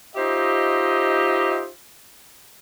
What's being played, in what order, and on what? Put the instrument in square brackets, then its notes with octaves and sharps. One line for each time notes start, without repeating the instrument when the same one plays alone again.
[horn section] D#4 F4 G4 C5 D#5 E5